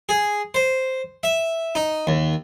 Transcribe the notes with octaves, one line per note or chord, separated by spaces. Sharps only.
G#4
C5
E5
D#4
D#2